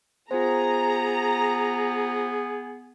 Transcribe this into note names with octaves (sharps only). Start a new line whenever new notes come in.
B3 F4 G#4 C5 A#5